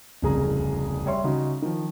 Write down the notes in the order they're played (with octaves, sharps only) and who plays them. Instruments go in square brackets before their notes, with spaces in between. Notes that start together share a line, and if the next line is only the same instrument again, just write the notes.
[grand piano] D1 C2 F2 C#3 G#4 A#5
G3 C#5 E5 C6
C#3 D#4 F#4
D#3 F3